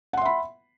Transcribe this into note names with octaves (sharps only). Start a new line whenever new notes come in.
E5 F#5 B5 C6